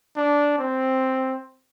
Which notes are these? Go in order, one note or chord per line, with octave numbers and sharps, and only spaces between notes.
D4
C4